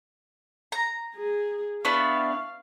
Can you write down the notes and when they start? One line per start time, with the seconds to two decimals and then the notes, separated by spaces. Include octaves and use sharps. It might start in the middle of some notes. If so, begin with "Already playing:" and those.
0.72 A#5
1.16 G#4
1.85 B3 D4 E4 F5 C#6